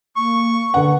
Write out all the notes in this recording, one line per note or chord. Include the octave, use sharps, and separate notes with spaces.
A#3 C#6
D3 B4 F#5